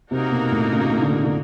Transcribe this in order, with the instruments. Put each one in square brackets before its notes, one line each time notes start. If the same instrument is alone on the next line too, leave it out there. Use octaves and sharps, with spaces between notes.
[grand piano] C3 [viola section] A#3 D#4 F#4 A#4
[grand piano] B2
A2
C#3
D3
D3